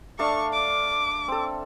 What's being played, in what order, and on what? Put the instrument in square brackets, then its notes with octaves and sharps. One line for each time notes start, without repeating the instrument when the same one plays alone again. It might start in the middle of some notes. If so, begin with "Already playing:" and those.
[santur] A3 D4 F5 [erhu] C#6
[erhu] D6
[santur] C4 A4